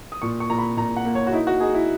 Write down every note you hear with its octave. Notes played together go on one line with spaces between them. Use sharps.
D#6
A#2 C#6
C#6
A#2 A#5
B5
A#2 A#5
F#5
A#3
C#5
F#4
D#4 E4
F#4
D#4 G#4
E4